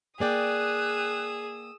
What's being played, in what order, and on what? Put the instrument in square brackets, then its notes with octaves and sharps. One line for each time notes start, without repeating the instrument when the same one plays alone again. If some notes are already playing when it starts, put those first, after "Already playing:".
[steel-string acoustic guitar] A#3 D5 G5 [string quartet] G#4 [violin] D#6 E6 [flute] F#6